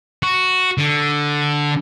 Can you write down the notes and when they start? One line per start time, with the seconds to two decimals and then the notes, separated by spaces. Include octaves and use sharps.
0.23 F#4
0.78 D3